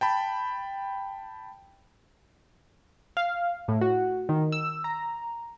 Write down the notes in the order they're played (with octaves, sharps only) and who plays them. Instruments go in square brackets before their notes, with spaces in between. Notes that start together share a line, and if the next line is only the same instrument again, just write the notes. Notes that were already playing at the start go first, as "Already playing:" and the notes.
[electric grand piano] G5 A5 B5
[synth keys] F5
A2
F#4
D#3
E6
A#5